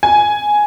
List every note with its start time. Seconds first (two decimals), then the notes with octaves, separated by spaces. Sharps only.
0.03 G#5